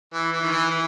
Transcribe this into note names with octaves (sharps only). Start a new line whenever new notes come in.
E3
E3
D#3
E3
E3